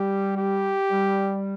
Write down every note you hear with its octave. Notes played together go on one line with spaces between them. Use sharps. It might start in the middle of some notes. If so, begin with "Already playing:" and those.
Already playing: G3 G4
G4
G3